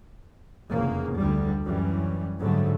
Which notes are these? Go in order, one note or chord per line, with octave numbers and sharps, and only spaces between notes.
F1 E2 C#3 A#3
D2 D3 G3
F#2 E3 G3 C#4
G#2 D3 F#3 G3 A3